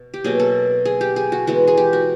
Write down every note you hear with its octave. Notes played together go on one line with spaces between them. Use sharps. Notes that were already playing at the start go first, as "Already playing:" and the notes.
Already playing: B2
G4
B2 F#3 A#3 G#4
A4
G#4
G4
G#4
F#4
E3 G#3 B3 F#4
G#4
G4
F#4